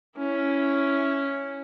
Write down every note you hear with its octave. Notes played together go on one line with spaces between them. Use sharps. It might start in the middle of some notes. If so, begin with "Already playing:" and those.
C#4 E4